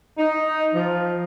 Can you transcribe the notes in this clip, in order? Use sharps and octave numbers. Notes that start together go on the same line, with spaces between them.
D#4
F3